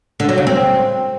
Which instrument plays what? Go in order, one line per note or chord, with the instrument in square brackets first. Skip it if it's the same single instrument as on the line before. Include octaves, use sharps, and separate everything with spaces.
[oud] D3
F#3
C#3
C4